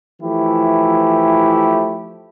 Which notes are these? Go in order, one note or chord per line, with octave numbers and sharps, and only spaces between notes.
E3 F3 A3 E4 G4